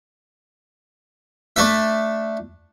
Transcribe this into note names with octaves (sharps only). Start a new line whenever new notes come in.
A3 D4 E5